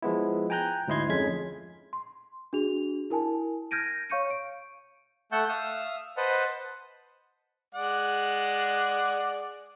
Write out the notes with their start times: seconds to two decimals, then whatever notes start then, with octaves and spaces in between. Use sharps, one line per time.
0.02 F3 G#3 B3 E4
0.50 G5 G#5 A#5 F#6 G6
0.88 D2 G#2 E4 D#5 C6 G#6
1.09 F2 G#3 C#4 G#6 B6
1.93 C6
2.53 D4 F#4 G#4 F7
3.10 E4 A#4 G#5 A5
3.71 F6 G6 G#6 A#6 D7 D#7
4.10 C#5 F5 C#6 G6 C#7 D#7
4.31 D7
5.32 A3 E5 F#5 A5 C#6 G6
5.49 E5 F5 D#6
6.17 B4 C5 D#5 F#5 A5
7.75 G#3 D5 F#5